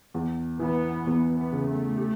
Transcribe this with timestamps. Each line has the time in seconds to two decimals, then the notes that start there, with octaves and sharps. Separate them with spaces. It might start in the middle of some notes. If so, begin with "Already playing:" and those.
0.14 E2
0.59 E3 B3
1.07 E2
1.37 B3
1.53 C#3
1.67 A3
1.98 G4